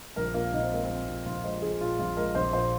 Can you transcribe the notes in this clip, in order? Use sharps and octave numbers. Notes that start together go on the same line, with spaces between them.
A#1 A#4
A#2 A#3
A#1 D#4
C4
G#3 A#3
C4
A#1
A#2
A#1 F4
G#3 C5
A#1 G#4
A#2 F4
A#1 F4
G#3 A#4
A#1 C5
A#2 C5